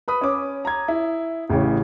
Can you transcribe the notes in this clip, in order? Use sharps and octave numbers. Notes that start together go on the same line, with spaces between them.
B4 B5 D#6
C#4 D6
A#5 G#6
E4
A1 C#3 E3 E4 G4 C#5